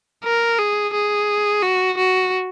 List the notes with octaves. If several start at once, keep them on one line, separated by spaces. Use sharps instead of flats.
A#4
G#4
G#4
F#4
F#4